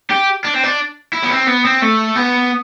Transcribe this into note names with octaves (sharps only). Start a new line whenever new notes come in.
G4
D4
C4
D4
E4
B3
C4
B3
C4
A3
B3